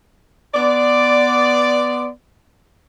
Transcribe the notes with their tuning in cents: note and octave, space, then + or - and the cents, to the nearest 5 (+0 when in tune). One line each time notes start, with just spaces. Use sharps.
B3 +0 D5 +0 C6 -25